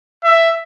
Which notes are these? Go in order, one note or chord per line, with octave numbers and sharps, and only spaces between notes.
E5